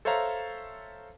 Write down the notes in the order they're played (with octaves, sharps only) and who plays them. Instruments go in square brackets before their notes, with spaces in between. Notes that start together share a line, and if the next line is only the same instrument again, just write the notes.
[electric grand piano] A4 C5 C#5 E5 F5 A#5